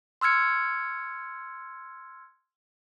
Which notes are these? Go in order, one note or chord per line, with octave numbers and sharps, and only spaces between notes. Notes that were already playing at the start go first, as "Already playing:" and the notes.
C6 E6 F6 G#6 C#7